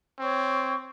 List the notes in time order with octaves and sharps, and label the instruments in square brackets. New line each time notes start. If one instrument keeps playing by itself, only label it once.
[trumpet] C4 [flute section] C#5 C#6